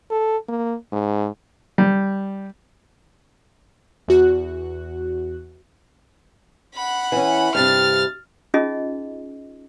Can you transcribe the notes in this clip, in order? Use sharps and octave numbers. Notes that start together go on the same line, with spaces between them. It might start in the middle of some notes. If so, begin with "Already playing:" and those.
A4
A#3
G#2
G3
E2 F#4 F#6
F#5 B5
E3 C#4
G2 C3 F6 A6
C#4 D#4 F4 G#4 D#5